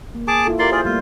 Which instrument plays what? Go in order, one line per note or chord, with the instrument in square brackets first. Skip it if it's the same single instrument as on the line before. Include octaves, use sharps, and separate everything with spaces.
[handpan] A#3
[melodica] G#4 A5 D6
[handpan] E4 F4 A4
[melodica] A#3 D5 C6 [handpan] F4 G4
[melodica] F4 G#4 D5 [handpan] C5
[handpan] G3 A3 A#3 [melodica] F4